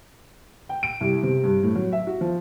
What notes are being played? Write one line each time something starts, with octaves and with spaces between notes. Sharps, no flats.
G5
D7
C2
C3
G2
A2
F#3
E5
F#4
F3